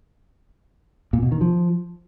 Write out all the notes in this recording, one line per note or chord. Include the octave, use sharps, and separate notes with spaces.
A#2
B2
D#3
F3